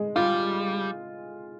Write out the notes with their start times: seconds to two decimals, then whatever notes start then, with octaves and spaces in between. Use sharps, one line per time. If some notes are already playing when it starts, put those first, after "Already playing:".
Already playing: G#3
0.16 G3 F4